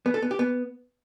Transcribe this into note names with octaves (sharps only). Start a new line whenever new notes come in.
B3
A4
B3
G4
B3